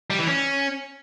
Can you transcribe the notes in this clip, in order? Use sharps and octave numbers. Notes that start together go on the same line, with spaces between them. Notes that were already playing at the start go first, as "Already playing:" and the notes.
G3
E3
C#4